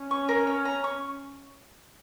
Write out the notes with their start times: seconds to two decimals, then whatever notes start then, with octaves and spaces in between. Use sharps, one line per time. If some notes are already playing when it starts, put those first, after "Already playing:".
Already playing: C#4
0.11 C#6
0.29 A#4
0.47 C#5
0.65 A#5
0.84 C#6